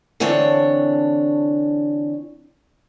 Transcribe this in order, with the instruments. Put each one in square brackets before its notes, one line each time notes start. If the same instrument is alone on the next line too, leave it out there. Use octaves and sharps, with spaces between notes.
[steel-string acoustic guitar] D3 E3 C4 D4 C#5